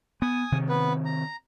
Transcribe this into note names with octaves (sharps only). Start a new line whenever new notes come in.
B3 G#5 D#6
C3 D#3
B3 B4
A#5